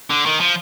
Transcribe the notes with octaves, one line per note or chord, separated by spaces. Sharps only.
D3
D#3
F3